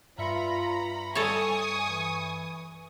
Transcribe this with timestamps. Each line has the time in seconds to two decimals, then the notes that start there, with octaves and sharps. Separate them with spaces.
0.18 G2 F4 E5 A#5 B5 C#7
1.15 G3 A4 C#5 G#5 C#6 D#6
1.88 E3